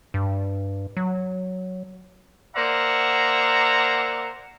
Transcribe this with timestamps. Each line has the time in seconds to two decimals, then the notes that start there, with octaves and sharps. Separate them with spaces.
0.14 G2
0.97 F#3
2.56 A#3 C5 D5 E5 F#5 A#5